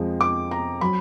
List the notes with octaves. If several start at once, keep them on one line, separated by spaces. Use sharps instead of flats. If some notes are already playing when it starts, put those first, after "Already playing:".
Already playing: F2 F3 G#3
D6
A#5
F#3 B5